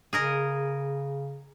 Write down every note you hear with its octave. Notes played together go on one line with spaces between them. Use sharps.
C#3 G#4 A#4 D#5